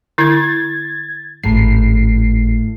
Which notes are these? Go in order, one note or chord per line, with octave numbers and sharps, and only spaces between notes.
D3 E4 G#6 A6
G#1 A2 C7